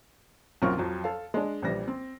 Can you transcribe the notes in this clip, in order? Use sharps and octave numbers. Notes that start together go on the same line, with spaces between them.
B1 F#2 C4 F4 A#4 C#6
F2 F3 F#3
A4 F5
G#3 D4
A#1 E3 G3 A#6
C4